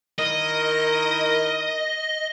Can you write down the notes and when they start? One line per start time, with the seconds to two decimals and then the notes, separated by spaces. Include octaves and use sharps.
0.19 D#3 E4 A#4 D#5